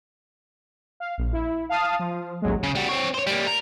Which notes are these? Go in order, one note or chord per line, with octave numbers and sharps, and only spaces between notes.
F5
A#1
E4
F5 A5 D#6 F6
F3
A1 D#2 F#3 G#3
C#3
G3 F#4
C4 C#5
C5 C#5
G3 A#3
A#4